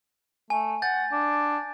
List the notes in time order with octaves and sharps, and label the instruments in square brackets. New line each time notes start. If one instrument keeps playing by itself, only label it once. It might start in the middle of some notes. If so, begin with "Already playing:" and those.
[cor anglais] A3 [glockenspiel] G#5
[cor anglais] F#5 [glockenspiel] G6 A6
[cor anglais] D4